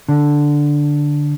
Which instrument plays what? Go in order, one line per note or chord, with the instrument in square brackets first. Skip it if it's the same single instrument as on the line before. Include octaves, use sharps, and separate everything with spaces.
[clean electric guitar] D3